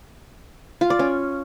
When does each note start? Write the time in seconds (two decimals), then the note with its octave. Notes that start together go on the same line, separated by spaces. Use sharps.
0.81 F4
0.90 D5
0.99 C#4